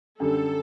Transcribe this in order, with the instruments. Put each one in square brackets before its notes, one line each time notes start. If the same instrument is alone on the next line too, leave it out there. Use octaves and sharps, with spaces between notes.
[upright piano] F#2 D3 G3 D4 [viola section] A4